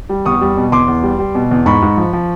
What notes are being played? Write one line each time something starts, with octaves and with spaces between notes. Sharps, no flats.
G3
E2 C#6 D#6
G3
B2
E2 C6 D6
E2
G3
G3
B2
E2
G#2 B5 C#6
G#2
F3
F3